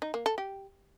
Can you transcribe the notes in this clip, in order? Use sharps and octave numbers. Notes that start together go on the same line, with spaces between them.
D#4
A#3
A4
G4